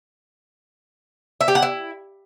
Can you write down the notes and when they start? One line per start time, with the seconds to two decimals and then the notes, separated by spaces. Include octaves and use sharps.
1.41 E5
1.48 G4
1.55 F#5
1.62 E4